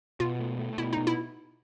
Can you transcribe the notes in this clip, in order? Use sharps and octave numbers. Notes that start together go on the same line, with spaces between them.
B2 F4
A3
A3
B2 E4
B2 D#4
E4